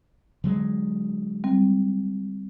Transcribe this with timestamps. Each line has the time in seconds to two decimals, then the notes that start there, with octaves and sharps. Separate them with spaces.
0.44 D3 F#3 G#3
1.44 G3 C4